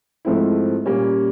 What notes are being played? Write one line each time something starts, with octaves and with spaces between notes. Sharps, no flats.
G#2 F3 A3 C4 E4
A#2 G3 A#3 C#4